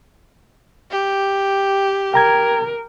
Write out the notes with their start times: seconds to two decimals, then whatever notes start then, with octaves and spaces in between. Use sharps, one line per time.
0.91 G4
2.14 A#4 G5 A#5 G#6